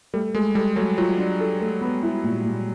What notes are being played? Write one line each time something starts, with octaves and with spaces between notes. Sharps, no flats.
G3 A3
G#3 A3
G3 A4
F#3 A3
F#3 F4
D4
A4
A3
B3
E4
A#2
A#2